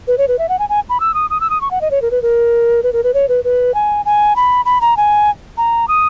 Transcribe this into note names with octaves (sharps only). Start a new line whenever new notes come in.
B4
C#5
B4
E5
F#5
G#5
G#5
B5
E6
D#6
D#6
E6
D#6
C#6
F#5
D#5
C#5
A#4
B4
A#4
B4
A#4
B4
C#5
B4
B4
G#5
G#5
B5
B5
A#5
G#5
A#5
D#6